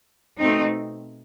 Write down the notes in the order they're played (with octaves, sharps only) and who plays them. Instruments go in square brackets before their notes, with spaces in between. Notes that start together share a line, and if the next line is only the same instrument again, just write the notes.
[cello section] B2 A3 C4 D#4